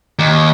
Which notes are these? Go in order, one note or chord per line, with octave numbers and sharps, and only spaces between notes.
D#2